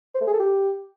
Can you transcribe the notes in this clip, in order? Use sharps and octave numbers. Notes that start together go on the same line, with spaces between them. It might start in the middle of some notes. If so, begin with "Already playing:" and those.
C5
A3
G#4
A4
G4